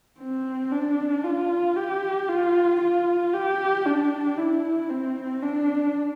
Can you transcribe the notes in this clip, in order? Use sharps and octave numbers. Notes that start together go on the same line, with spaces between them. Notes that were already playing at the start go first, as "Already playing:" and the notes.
C4
D4
F4
G4
F4
F4
G4
D4
E4
C4
D4